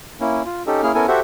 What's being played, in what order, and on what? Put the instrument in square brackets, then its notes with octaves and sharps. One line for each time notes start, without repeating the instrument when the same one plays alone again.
[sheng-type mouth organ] A#3 C#4 E4
F4
C#4 D#4 G4 A4
A#3 C#4 E4 G#4 F6
B3 C#4 E4 A4 A#4 G#5
F#4 G4 A4 C5 E5 F#5